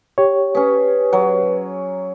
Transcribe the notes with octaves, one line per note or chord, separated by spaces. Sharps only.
G4 C#5
C#4 G#4 B4
F#3